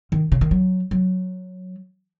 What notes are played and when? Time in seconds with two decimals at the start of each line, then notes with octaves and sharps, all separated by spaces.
0.12 D#3
0.32 C#3
0.41 D#3
0.51 F#3
0.91 F#3